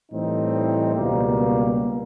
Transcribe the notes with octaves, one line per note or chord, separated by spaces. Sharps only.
A2 E3 G3 C4 D#4
C#2 B2 G3 A#3